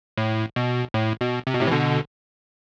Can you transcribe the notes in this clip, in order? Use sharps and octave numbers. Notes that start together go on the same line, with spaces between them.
A2
B2
A2
B2
C3
B2
A2 C3
E3
B2 D3